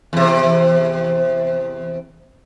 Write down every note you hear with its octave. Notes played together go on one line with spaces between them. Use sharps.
E2 C3